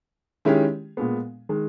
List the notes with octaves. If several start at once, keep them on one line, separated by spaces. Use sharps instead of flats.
D#3 G#3 C#4 E4 G4
A#2 G#3 B3
D#3 G#3